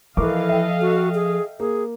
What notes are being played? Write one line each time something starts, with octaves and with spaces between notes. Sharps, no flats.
E3 F3 A4 A#4 D#5 F5 C#6 D6
E5 G5
F#4
G#4
A#3 G#4